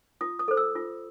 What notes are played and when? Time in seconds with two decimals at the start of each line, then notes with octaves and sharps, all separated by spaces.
0.21 F4 D#6
0.39 D#6
0.48 A4 C5
0.57 E6
0.75 F4